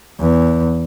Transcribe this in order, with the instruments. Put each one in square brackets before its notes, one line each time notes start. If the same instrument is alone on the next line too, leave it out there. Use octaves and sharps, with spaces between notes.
[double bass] E2